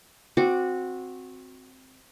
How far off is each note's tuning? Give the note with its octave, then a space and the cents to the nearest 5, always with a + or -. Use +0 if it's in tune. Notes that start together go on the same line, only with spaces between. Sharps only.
C4 +0 F#4 -15 D6 +0